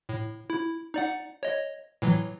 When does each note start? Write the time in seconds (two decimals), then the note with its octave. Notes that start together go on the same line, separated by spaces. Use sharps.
0.09 A2
0.50 E4
0.94 D#4 D5 F#5
1.43 C#5 D#5
2.02 A2 E3 F#3